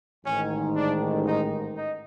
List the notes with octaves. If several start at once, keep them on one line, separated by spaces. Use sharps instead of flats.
A1 G#2 D#3 C#4
D4
D#4
D#4